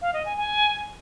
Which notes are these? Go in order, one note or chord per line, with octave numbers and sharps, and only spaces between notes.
F5
D#5
G#5
G#5